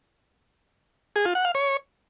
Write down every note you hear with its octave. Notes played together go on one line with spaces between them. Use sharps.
G#4
F4
F#5
F5
C#5